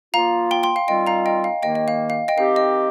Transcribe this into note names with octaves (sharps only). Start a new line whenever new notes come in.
F3 A#3 F4 F5 A#5
G5 C6
G5 C6
F5
D#3 G3 C4 F4 D#5 G5
F5 A#5
D#5 G5
F5
D#2 D#3 A#3 D#5 G5
D#5
F5
F5
D#5 G5
D#3 C4 G4 F5
D#5